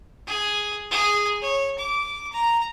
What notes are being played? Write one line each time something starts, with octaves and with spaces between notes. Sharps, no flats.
G#4
G#4
C#5
D6
A#5